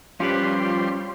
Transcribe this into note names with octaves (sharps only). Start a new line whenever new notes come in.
F3 G3 C#4 G4 B4 C6